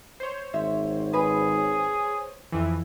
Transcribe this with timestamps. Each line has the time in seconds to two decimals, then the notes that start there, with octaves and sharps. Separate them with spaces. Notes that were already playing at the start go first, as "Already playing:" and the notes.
0.20 C5 C#5
0.54 G#1 E5
1.14 G#4 B4
2.52 F2 E3